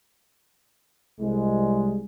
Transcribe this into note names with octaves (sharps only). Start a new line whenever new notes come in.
C2 G3 G#3